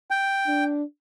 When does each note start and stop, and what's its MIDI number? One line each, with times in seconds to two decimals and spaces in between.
0.11 0.64 79
0.47 0.83 62